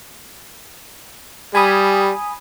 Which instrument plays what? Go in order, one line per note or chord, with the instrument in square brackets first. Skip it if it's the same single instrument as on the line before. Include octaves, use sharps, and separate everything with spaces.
[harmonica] G3 [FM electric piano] G#5 B5 D#6